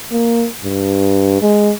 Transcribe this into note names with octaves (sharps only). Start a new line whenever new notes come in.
A#3
G2
G#3